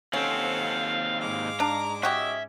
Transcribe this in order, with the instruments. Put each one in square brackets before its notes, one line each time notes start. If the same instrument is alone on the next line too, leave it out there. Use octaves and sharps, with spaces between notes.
[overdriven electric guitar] D#2 C4 [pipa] C#4 [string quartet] A4 C5 F#5 [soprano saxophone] F5
[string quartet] G#2 G#3 D6 [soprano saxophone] F5
[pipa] D4 [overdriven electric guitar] A#5
[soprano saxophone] C#4 [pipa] F#4 G4 D#5 [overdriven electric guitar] E5